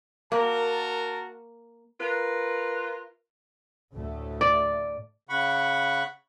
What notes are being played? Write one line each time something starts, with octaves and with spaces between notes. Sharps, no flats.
A#3 F#4 A#4 A5
F4 A#4 B4
D2 A2 A3
D5
C#3 F#5 B5 C#6